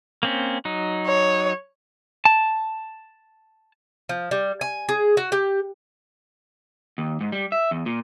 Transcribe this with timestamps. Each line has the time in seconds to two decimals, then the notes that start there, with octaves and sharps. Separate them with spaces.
0.23 A#3 C4 C#4
0.65 F#3 D#4
1.07 C#5
2.25 A5
4.09 F3
4.31 G3
4.61 G#5
4.89 G#4
5.17 F#4
5.32 G4
6.98 D#2
7.21 G#2
7.32 G3
7.52 E5
7.71 E2
7.86 A#2